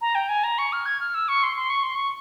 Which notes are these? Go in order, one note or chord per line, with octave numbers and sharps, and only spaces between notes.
A#5
G5
G#5
A#5
C#6
F6
G#6
F6
E6
C#6
C6
C6
C#6
C6
C#6